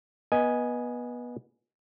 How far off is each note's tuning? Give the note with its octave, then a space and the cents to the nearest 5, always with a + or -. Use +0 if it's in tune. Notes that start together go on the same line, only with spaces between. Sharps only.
B3 -20 D#5 +0 G#5 +0